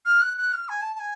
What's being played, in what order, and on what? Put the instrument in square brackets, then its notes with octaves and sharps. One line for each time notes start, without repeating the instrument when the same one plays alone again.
[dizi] F6
F#6
F#6
F6
G#5
A5
A5
G#5